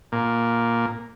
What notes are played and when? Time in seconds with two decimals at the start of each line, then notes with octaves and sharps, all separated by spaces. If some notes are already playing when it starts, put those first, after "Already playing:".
0.12 A#2